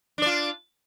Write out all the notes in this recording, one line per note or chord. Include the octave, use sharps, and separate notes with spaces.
D4 F4 D5